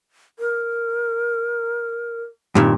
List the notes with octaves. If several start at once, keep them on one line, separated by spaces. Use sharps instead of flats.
A#4
G2 A#2 D#3 C4